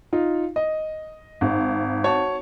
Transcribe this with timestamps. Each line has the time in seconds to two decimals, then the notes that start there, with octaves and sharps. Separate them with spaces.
0.13 D#4 F4
0.56 D#5
1.41 G#1
2.04 F#4 C#5 A5